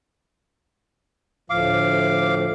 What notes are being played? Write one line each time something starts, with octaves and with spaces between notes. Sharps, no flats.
D2 A2 F3 F5 D6